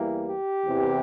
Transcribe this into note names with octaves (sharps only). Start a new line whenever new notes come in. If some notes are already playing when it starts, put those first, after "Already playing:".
Already playing: E2 E3 G3 A#3
G4
E2 C3 E3